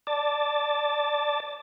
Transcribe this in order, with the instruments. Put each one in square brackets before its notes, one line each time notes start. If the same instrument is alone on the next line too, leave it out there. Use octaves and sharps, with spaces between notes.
[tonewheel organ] D5 A5